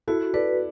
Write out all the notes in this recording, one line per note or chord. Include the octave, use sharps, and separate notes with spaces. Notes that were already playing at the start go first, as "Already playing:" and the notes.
E4 F#4 A4
A4 B4 D5